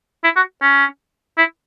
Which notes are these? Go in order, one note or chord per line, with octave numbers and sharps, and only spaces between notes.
E4
F#4
C#4
E4